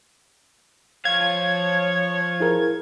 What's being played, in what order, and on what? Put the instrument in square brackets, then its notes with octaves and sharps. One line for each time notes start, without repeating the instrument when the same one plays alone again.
[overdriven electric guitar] F3 F5 [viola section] C#5 [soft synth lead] G#6
[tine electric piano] E4 G#4 A#4